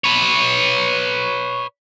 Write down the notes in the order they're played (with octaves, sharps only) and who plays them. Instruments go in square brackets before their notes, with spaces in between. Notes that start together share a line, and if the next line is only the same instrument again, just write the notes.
[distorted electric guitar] B4 C#5